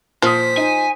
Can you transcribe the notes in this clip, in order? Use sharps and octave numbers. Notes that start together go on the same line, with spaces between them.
A#2 F3 C5 D#6 B6
D#4 G#5